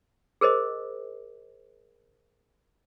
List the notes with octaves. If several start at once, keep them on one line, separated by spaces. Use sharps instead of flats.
G#4 A#4 C5 D#5